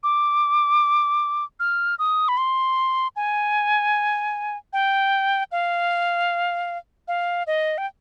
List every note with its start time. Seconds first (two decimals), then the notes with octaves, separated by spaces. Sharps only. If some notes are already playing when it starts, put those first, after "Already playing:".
0.03 D6
1.60 F6
1.99 D#6
2.28 B5
2.37 C6
3.16 G#5
4.73 G5
5.52 F5
7.08 F5
7.47 D#5
7.78 G5